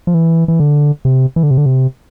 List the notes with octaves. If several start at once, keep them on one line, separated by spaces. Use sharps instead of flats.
F3
E3
E3
D3
C3
E3
D3
C3
D3
C3